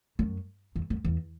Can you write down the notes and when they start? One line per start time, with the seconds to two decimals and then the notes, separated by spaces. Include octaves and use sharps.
0.19 F#2
0.75 E2
0.90 F#2
1.04 E2